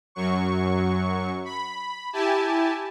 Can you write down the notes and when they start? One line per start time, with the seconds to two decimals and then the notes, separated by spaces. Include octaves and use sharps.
0.15 F#2 F#3 C#6
1.45 B5
2.13 E4 G4 G#5 A5